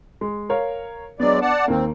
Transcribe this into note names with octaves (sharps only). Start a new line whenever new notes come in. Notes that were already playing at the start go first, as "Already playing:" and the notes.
G#3
A#4 C#5 F5
F#3 G#3 B3 D4 D5
D5 F#5 A5
D#2 A#3 C4